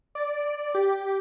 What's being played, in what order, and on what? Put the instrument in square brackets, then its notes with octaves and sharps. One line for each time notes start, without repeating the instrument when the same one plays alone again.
[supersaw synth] D5
G4